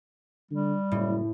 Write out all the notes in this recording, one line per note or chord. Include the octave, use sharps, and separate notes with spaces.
D3 G3
F#1 A2